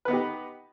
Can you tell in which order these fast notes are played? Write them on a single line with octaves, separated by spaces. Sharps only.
B4 B3 D#4 G4